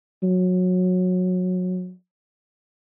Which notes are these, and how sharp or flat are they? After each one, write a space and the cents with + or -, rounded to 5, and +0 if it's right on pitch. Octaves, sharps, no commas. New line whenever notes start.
F#3 -20